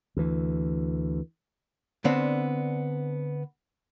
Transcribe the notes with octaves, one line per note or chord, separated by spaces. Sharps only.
D2 E3
D3 B3 C4 D4